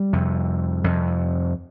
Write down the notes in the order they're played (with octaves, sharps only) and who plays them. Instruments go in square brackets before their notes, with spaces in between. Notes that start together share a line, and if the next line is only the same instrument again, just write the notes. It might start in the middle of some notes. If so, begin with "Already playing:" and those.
Already playing: [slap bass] G3
F2 C3
F2 C3